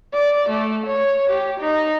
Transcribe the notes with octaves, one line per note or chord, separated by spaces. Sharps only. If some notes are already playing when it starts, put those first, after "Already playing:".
D5
A3
C#5
G4
D#4